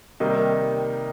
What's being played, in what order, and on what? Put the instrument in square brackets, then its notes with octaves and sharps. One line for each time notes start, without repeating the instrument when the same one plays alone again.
[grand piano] C3 D#3 G3 A#3 D#4